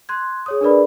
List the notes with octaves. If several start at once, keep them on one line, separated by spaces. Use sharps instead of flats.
C6 F#6 G#6
G#4 C#5 D#6
D4 G#4 A#4 B4 D5 B5